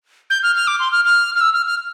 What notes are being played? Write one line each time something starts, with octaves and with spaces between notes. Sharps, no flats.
G6
F6
F6
D6
C6
F6
F6
F6
E6
F6
F6